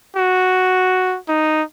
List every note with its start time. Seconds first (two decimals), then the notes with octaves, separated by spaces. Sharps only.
0.16 F#4
1.28 D#4